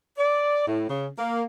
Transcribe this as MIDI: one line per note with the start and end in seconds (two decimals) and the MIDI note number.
0.18 0.66 74
0.68 0.85 45
0.89 1.07 49
1.18 1.43 58